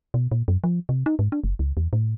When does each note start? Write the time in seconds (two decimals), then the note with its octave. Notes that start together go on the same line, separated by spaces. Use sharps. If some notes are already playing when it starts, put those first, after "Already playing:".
0.14 B2
0.31 A#2
0.48 F#2
0.64 F3
0.89 C3
1.06 D#4
1.19 G#2
1.32 D4
1.44 F#1
1.59 C#2
1.77 E2
1.93 A2